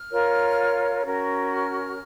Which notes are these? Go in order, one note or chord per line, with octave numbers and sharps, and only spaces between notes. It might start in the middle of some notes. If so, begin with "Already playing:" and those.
Already playing: F6
F4 A#4 C#5
C#4 F#4 A#4
F6